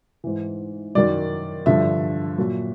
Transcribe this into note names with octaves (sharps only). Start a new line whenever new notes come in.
G#2 E3
F#2 D#3 F#3 D5
G2 D3 F3 E5
A#2 F#3